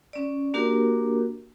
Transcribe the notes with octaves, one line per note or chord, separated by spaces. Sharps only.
C#4 D5
A#3 D4 F#4 G4 A#4